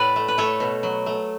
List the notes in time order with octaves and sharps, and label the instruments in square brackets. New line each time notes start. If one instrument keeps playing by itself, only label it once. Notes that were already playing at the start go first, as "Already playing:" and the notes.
Already playing: [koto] A2 A4 B4 D5
A3
B4
A3 A4 C#5
B2
F#3
A3